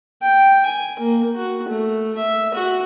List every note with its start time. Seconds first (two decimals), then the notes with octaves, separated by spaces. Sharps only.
0.22 G5
0.66 G#5
0.99 A#3
1.36 F#4
1.69 A3
2.18 E5
2.54 F#4